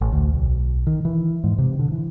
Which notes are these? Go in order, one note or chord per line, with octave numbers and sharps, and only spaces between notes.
A1
D2
B1
D#3
E3
G#2
C3
D3
E3